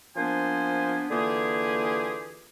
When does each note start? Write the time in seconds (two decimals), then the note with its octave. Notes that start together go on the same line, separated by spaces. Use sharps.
0.17 F3 A#3 B3 D4 C5 G#5
1.11 D3 E3 A#3 F4 G4 G#4